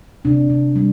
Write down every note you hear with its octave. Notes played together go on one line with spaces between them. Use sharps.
C3 D4
C3
G3